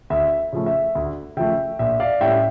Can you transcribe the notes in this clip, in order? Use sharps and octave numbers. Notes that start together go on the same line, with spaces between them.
D2 E5
C#3 F3 A3
E5
D2
C#3 F3 A3 E5 G5
A#1 E5
D5 F5
A2 G3 C#4 E5 G5